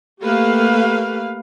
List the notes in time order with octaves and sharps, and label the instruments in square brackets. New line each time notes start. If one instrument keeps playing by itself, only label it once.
[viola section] A3 A#3 G4 B4 F5